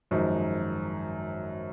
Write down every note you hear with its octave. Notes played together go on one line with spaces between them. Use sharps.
G#1 F#2 F3 G#3 D#4